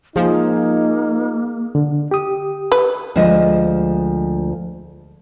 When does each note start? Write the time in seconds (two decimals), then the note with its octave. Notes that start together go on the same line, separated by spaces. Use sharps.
0.16 F3 A#3 D#4 G#4
1.75 D3
2.11 G4 D#6
2.72 B4
3.16 D2 F3 G#3 D#5